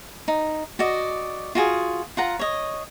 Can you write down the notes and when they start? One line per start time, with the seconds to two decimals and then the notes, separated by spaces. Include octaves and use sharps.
0.28 D#4
0.79 F#4 D5 D#5
1.55 F4 F#4 G#4
2.17 F4 F#5 A#5
2.39 C#5 D#5